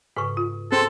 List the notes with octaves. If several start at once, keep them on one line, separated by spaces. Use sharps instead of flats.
G#2 C#3 A4 B4 C#6
F4
C4 F#4 G#4 A4 A#5 C6